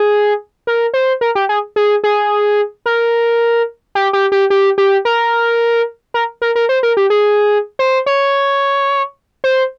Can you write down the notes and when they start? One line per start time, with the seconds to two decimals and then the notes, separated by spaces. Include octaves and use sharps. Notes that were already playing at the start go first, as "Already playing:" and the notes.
Already playing: G#4
0.67 A#4
0.94 C5
1.21 A#4
1.35 G4
1.49 G#4
1.76 G#4
2.04 G#4
2.86 A#4
3.95 G4
4.13 G4
4.32 G4
4.50 G4
4.78 G4
5.05 A#4
6.14 A#4
6.42 A#4
6.56 A#4
6.69 C5
6.83 A#4
6.97 G4
7.10 G#4
7.79 C5
8.06 C#5
9.44 C5